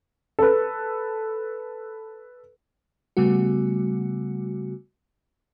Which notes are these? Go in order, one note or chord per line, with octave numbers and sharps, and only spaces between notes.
A4 B4
C#3 G3 A3 B3 F#4